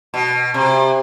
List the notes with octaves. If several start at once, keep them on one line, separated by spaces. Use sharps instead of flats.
B2
C3